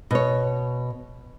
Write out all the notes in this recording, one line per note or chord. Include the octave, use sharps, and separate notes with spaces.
B2 C#5